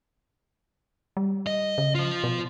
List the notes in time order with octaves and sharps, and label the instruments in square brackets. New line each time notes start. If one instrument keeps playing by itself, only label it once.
[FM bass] G3
[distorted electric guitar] D#5
[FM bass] C#3
[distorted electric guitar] F4 C5
[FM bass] B2